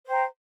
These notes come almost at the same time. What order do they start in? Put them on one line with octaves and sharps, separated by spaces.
C5 G5 A#5